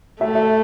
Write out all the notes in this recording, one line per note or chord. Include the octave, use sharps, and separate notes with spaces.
A3 E5
E5